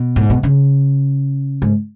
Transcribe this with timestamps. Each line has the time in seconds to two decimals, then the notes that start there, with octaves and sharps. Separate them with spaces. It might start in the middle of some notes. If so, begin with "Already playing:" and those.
Already playing: B2
0.16 G#2
0.30 B2
0.43 C#3
1.62 G#2